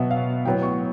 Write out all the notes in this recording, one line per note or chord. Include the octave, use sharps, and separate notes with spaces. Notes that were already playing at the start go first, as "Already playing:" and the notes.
Already playing: B2 F#3 B3 D#5 E5
F5
A2 F#3 B3 G5
C#6